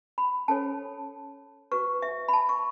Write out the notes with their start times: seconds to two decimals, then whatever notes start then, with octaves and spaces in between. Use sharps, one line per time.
0.18 B5
0.48 C#4 A4 C#5 A5
1.72 F#4 B4 C#6
2.02 E5
2.28 B5
2.33 A5
2.49 C#6